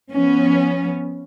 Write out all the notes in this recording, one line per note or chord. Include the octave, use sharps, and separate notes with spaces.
F3 B3 C#4